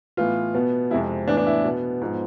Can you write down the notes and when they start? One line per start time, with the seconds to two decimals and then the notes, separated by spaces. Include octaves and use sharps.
0.17 A2 E3 B3 F4
0.54 B2 B3
0.91 F2 C3 G#3 E4
1.27 A2 E3 B3 D4
1.37 D4
1.46 E4
1.64 B2 B3
2.01 G#2 F3 B3